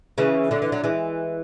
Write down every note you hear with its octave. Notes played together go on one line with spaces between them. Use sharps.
C#3 E3
D3 F#3
E3
F#3
E3 G#3